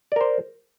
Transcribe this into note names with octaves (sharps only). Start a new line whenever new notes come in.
A#4 C5 D5